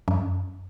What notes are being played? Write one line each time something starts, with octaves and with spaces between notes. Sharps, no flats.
F#2